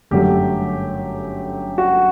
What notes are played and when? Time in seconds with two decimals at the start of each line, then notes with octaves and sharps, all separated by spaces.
0.11 G1 F#2 F#3 A3 G4
1.78 F#4